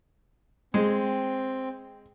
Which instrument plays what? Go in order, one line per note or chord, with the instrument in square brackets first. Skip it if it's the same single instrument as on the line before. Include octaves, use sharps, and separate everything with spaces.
[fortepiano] G#3 [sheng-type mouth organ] C4 G5